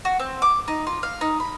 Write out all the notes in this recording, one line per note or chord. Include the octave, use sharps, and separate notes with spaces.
F#4
C4
D6
D#4
F4
F5
D#4
B5